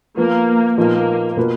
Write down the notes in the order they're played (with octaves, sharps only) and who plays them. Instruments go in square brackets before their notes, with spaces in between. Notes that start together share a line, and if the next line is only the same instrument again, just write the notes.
[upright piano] F3 B3 F4 B4 [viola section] A#3
[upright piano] A#2 F3 B3 D#4 A#4 [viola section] A#3
[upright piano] B2 A#3 F4 B4